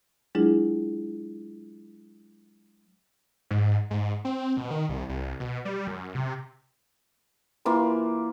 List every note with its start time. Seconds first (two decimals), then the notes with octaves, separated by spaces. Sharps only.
0.35 F#3 G#3 D4 E4 F4 G#4
3.51 G#2
3.90 G#2
4.25 C4
4.57 B2
4.71 D#3
4.89 C2
5.09 C2
5.40 B2
5.65 G3
5.87 F#2
6.15 C3
7.65 E3 A#3 F4 C6